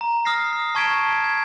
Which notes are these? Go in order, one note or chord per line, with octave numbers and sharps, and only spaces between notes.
A#5
D#6 F6 A#6 C7
C7
A5 C#6 G#6 B6 D7 E7
G#6